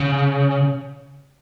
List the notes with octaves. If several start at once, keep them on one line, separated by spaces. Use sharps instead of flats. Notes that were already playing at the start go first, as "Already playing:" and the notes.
Already playing: C#3